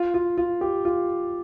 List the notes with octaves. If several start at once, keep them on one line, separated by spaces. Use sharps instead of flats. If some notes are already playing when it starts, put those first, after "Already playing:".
Already playing: F4
F4
F4
G4
F4